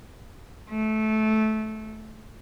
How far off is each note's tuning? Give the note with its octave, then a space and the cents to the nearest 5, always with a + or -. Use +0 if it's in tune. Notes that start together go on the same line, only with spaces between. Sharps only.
A3 -15